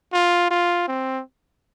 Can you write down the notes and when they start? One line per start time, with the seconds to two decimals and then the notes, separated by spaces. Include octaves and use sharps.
0.13 F4
0.51 F4
0.88 C4